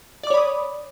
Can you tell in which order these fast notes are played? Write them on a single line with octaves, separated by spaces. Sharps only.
D5 D6 C#5 B5 D#6